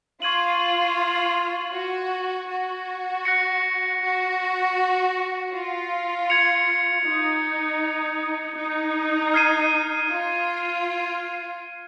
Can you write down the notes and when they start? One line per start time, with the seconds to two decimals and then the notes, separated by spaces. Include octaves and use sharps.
0.21 F4 C#6 G#6 D#7 F#7
1.74 F#4
2.49 F#4
3.25 F#6 A#6 C#7
4.02 F#4
5.53 F4
6.30 G#6 C#7 F7
7.06 D#4
8.58 D#4
9.34 F6 G#6 C7 D#7
10.10 F4